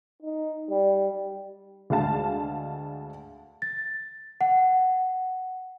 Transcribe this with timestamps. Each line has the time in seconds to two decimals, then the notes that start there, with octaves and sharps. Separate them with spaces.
0.23 D#4
0.70 G3
1.90 D2 G#3 F5 A5
3.62 A6
4.41 F#5